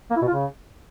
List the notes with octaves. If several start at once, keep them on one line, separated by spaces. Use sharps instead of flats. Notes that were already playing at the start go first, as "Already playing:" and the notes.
A#3
E4
B2
F4
C#3